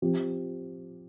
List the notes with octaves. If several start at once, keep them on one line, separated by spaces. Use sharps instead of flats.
F3 C4 G4